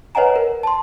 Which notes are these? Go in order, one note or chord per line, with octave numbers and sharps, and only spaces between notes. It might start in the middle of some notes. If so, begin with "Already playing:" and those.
B4 C#5 D#5 F#5 G#5 A#5
A#4
A5 C6